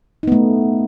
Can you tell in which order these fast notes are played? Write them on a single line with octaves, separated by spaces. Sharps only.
D#4 B3 A3